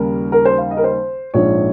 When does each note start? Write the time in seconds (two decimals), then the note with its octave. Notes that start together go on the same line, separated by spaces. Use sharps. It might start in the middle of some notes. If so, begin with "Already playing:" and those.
Already playing: D#2 C#3 G3 A#3 A#4
0.32 A#4
0.45 C5
0.58 F5
0.71 D#5
0.77 A#4
0.84 C5
1.34 A#1 G#2 F3 C#5